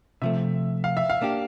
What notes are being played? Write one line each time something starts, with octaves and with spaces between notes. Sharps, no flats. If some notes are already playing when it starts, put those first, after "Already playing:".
C3 F3 A3 E5
F5
E5
F5
A#3 D4 G4